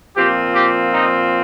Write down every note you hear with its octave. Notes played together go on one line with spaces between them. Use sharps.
A#2 F3 C4 G4
G4
D#4